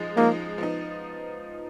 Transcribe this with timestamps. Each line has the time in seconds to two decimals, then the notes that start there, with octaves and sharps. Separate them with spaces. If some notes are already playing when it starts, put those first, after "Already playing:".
Already playing: F3 G#3 D#4
0.17 F3 G#3 A#3 D#4
0.58 F3 B3 D#4